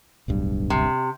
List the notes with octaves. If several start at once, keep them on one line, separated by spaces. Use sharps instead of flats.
D1 B1 G2
C3